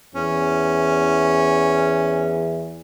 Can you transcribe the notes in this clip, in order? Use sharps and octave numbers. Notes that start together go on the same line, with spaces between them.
E2 C#4